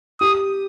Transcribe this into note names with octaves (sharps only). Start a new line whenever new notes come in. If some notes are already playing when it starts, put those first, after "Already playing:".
G4 D#6